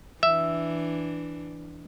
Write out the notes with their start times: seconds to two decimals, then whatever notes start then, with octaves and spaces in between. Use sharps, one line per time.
0.23 E3 D4 E5